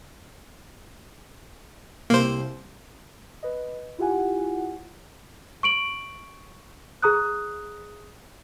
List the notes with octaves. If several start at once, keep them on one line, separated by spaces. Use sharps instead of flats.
C2 G3 A#3 C4 C5
B4 D#5
E4 F4 G4 F#5 G#5
C#6 D7 F#7
G#4 A#5 D#6 F#6